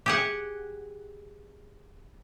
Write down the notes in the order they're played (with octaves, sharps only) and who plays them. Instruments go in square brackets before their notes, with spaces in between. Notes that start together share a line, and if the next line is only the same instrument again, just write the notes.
[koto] G4 G#4 F#5